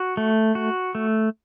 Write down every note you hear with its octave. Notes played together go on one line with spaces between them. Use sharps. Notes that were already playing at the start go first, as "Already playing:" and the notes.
Already playing: F#4
A3
F#4
A3